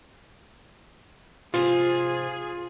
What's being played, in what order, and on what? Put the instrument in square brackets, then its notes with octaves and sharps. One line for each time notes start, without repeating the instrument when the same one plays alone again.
[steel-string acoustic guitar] G#2 C3 F3 [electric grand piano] F4 [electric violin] G#4